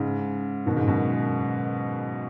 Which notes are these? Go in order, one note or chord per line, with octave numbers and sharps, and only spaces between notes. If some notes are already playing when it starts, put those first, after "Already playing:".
Already playing: G#2 C#3
B2 D#3
G#2 C#3
F#2 B2